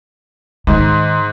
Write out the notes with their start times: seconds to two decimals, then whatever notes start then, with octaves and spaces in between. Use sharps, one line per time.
0.67 G#2 D#3